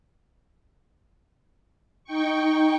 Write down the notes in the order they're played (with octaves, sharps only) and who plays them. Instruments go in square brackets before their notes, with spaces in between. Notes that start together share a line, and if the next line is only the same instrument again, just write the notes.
[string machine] D#4 G5 C#6